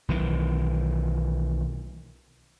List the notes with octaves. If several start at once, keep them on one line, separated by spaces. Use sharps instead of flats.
B1 D#3 E3